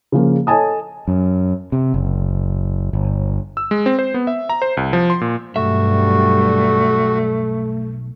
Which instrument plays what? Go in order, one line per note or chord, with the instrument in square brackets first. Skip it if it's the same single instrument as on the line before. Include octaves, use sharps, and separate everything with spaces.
[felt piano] C#3 F3 A#3
A4 C#5 D#5 G#5 A5 D#6
[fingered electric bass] F#2
C3
F#1
G1
[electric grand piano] E6
G#3
C4
C5
B3
E5
A#5
C5
C2
F3
C6
A#2
[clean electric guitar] B1 E5 [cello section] G2 G3 [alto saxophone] A3 [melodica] F#4